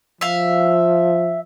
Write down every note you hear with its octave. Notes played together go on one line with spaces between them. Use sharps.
F3 E5 F5